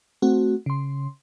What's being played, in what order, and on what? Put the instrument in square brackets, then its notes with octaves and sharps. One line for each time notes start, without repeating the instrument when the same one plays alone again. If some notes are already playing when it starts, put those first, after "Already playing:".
[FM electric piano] A3 C4 F#4
C#3 C6